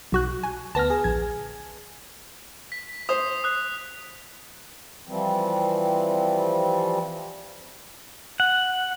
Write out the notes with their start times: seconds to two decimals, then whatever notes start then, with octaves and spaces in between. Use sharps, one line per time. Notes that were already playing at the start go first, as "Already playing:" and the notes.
0.12 B1 F#4 F#6
0.43 G#5
0.75 D2 B3 A5 F6 A#6
0.90 G#4
1.04 A#1 G#6
2.72 B6
3.09 C5 D#6
3.44 D#6 F#6
5.08 E3 F3 G3 C4
8.40 F#5